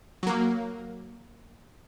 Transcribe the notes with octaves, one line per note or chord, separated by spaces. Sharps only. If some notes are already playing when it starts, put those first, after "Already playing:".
F#3 A#3